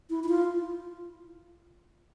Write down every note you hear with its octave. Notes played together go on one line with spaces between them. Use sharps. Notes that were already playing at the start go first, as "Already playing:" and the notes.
E4
E4
F4